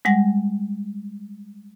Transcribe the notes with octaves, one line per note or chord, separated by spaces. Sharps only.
G3 G#3 F#5 A#6